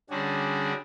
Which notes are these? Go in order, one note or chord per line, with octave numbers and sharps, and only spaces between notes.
D3 G3 C#4 D4 F#4 G#4